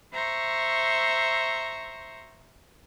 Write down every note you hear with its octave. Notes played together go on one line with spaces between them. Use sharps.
C5 E5 A#5 C#6